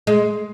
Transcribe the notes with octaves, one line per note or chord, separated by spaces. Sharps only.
G#3